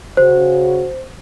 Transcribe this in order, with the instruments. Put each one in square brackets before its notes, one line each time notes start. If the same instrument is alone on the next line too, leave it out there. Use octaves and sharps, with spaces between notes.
[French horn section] C#3 F#4 [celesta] C5